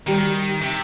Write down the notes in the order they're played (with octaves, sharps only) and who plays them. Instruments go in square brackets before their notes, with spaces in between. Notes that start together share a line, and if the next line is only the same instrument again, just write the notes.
[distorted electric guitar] D#3 [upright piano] G3 G4
[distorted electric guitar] C3